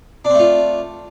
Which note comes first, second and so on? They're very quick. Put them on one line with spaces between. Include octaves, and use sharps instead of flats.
D4 C4 A3 F4